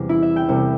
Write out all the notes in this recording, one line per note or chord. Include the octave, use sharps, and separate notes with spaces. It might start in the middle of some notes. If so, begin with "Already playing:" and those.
Already playing: E2 C3 G3
E4
E5
G5
C2 C3 G3